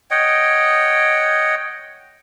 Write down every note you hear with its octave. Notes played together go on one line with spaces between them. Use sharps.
C#5 D#5 F#5 G5